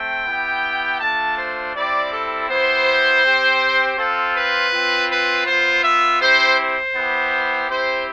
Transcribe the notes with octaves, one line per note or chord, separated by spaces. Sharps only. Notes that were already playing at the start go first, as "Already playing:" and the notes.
Already playing: A3 C4 G5
B3 E4 G4
A3 D4 F4 A5
C5
G3 C4 E4 D5
A4
B3 E4 G4 C5
C4 G4
C4 F4 A4
B4
C4 F4
B4
B3 F4 C5
E5
C4 E4 G4 C5
C5
B3 E4 G4
C4 E4 G4 C5